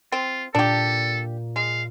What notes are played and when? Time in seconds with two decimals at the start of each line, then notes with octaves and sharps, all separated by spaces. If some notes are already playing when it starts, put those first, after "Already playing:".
0.12 C4 F4
0.55 A#2 D4 G4 A4
1.56 G#3 F5